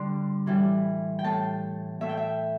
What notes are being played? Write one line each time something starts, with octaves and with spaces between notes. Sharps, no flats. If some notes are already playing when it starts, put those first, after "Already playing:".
Already playing: D3 G3 C6
A2 E3 G3
G5
A2 A3 A5
A2 A3 E5
G5
E5